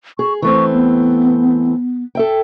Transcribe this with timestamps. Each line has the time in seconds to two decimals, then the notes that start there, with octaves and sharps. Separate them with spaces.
0.19 G#4 C#6
0.42 E3 A3 C4 C#6
0.73 B3
2.15 A4 E5 G5